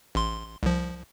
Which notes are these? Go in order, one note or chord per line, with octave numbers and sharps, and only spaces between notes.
A1 C6
C2 F3